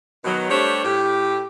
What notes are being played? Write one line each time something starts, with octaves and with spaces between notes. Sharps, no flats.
B2 D#3 F#3
G3 A3 D4 G4 C5 C#5
A2 G4